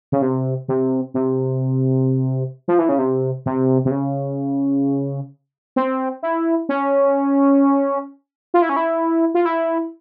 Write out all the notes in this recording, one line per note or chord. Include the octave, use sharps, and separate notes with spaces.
C#3
C3
C3
C3
F3
E3
C#3
C3
C3
C3
C#3
C4
E4
C#4
F4
E4
C#4
E4
F4
E4